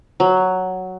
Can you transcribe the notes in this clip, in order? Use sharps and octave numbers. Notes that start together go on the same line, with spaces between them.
F#3